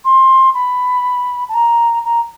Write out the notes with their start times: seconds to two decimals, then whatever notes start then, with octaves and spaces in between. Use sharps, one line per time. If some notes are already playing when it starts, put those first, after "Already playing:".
0.04 C6
0.54 B5
1.49 A5
1.54 A#5
2.04 A#5